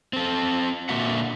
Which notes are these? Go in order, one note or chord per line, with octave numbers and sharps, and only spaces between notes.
C4 A4
A#2 D3 A#3 F#4 E5 F#5